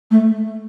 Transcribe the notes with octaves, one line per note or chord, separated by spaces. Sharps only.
A3